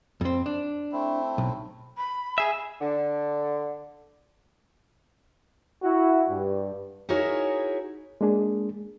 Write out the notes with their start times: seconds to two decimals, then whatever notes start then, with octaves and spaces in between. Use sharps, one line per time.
0.21 F2 C4
0.46 D4
0.92 A3 C4 E4
1.38 B1
1.97 B5
2.38 G#4 E5 G#5
2.81 D3
5.83 E4 F#4
6.30 G2
7.09 D#4 E4 F#4 G#4 A#4 C#5
8.21 G#3 A#3 D4 G#4